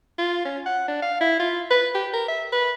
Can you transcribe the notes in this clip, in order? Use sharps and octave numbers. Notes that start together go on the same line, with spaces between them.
F4
C#4
F#5
D4
F5
E4
F4
B4
G4
A#4
E5
B4